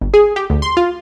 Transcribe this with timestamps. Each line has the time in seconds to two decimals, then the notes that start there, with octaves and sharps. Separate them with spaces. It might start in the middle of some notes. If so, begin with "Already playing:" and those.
0.01 G1
0.14 G#4
0.36 G4
0.50 D2
0.62 C6
0.77 F4